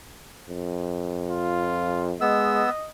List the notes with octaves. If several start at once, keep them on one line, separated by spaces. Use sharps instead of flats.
F2
F4
G#3 B3 D#5 E6